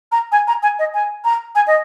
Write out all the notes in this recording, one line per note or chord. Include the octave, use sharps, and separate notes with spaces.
A#5
G#5
A#5
G#5
D#5
G#5
A#5
G#5
D#5